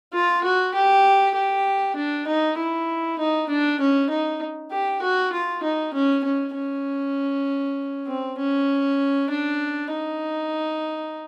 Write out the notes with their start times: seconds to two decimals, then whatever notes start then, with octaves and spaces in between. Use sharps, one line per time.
0.13 F4
0.44 F#4
0.74 G4
1.35 G4
1.96 D4
2.27 D#4
2.57 E4
3.19 D#4
3.50 D4
3.80 C#4
4.10 D#4
4.71 G4
5.02 F#4
5.33 F4
5.63 D#4
5.94 C#4
6.24 C#4
6.55 C#4
8.07 C4
8.38 C#4
9.30 D4
9.91 D#4